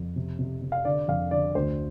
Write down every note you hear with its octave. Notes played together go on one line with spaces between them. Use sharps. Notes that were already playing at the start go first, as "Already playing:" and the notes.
Already playing: F2
C3
C3
C3
F5
D3 D5
F2 F5
D3 D5
D2 C5